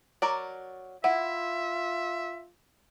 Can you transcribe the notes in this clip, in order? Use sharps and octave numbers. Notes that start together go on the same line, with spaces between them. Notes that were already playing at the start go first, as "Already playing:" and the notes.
F#3 A#4 D5
E4 F4 E5 F#5